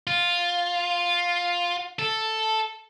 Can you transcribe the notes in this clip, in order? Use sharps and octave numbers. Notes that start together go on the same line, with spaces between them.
F4
A4